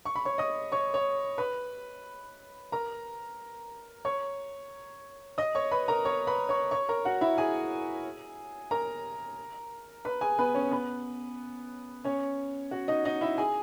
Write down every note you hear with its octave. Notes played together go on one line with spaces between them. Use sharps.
C#6
B5
C#5 C#6
D#5 D#6
C#5 C#6
C#5 C#6
B4 B5
A#4 A#5
C#5 C#6
D#5 D#6
C#5 C#6
B4 B5
A#4 A#5
C#5 C#6
B4 B5
C#5 C#6
C#5 C#6
A#4 A#5
F#4 F#5
E4 E5
G#4 G#5
A#4 A#5
B4 B5
G#4 G#5
B3 B4
C#4 C#5
B3 B4
C#4 C#5
F#4 F#5
D#4 D#5
D#4 D#5
E4 E5
G#4 G#5